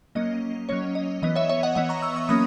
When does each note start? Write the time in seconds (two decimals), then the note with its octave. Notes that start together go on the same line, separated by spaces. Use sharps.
0.15 F#3 A#3 C#4 D#5
0.69 F#3 A#3 C#4 C#5
0.95 D#5
1.22 E3 B3 D#5
1.35 C#5 E5
1.49 C#5 E5
1.63 D#5 F#5
1.75 E3 B3 D#5 F#5
1.89 A#5 C#6
2.02 C#6 E6
2.16 C#6 E6
2.29 F#3 A#3 C#4 B5 D#6